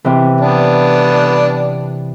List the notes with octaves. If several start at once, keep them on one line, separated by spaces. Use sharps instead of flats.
C3 E3
B3 D4